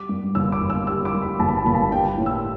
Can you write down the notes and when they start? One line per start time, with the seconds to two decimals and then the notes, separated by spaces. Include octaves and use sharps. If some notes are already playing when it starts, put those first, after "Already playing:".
Already playing: G3 D6
0.09 G2
0.35 G1 E6
0.52 D6
0.61 G1
0.70 E6
0.87 G3 E6
1.05 D6
1.14 G2
1.22 B5
1.39 G1 A5
1.49 B5
1.57 A5
1.66 G1 B5
1.75 A5
1.91 G3 G5
2.17 A2
2.26 E6